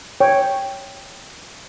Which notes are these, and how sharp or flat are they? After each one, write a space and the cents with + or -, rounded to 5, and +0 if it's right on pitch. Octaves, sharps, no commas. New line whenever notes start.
C#5 +0 G5 +0